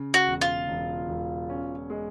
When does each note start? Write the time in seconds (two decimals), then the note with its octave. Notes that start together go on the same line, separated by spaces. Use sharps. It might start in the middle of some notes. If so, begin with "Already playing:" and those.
Already playing: C#3
0.14 F#4
0.27 E1
0.41 F4
0.68 E1
1.09 E1
1.49 C#4
1.90 G#3